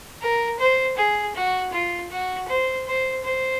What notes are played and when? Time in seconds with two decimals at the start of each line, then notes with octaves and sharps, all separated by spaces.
0.22 A#4
0.59 C5
0.97 G#4
1.35 F#4
1.73 F4
2.11 F#4
2.48 C5
2.87 C5
3.23 C5